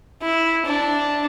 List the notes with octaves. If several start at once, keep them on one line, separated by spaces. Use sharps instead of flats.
E4
D4